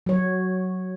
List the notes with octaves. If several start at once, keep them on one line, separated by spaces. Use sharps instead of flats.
F#3 C#5